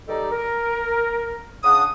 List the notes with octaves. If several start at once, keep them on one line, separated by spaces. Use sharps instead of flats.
G3 D#4 G4 A4 D5 D#5
A#4
C#3 D4 F#5 D#6